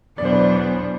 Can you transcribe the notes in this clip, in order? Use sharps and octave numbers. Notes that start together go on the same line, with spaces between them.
E2 B2 F#3 B3 D4 D5
C5
B4